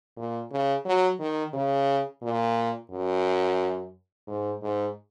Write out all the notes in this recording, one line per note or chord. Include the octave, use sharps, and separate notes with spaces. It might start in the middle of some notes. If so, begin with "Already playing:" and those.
A#2
C#3
F#3
D#3
C#3
A#2
F#2
G#2
G#2